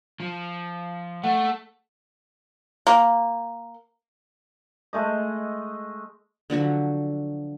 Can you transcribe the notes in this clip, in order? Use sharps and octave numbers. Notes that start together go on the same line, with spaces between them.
F3
A3 F#5
A#3
G#3 A3 D#5
D3 F3 F#3 F#4